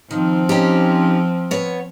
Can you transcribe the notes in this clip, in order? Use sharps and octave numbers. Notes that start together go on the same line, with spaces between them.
D#3 F3 C4
C#4 D#4 G4
B3 C#5